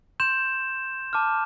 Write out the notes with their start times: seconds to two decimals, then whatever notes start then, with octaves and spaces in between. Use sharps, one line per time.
0.20 C6 G6 E7
1.13 A5 D6 F6